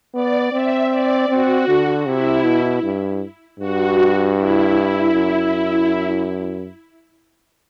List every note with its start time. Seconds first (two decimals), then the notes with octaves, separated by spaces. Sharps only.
0.14 B3 D5
0.52 C4 E5
0.91 D5
1.29 C4 F#4
1.68 D3
2.05 C3 E4
2.44 B2
2.83 G2
3.59 G2 F#4
4.36 E4
5.12 F#2